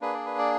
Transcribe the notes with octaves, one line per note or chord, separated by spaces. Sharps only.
A#3 D4 G#4 B4
D5
B4
D5